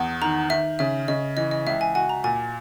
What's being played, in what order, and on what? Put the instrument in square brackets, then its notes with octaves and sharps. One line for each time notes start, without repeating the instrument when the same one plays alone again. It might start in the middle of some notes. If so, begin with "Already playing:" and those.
Already playing: [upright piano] E2
[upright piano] D#3 [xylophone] A#5
[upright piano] D#3 [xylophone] E5
[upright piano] C#3 [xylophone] E5
[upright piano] C#3 [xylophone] D#5
[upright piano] E3 [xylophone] D#5
[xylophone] D#5
[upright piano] C#2 [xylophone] E5
[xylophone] G#5
[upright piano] F#4 [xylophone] G#5
[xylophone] A#5
[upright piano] A#2 [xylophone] G#5